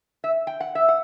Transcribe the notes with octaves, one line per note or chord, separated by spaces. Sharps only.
E5
G5
F#5
E5
F#5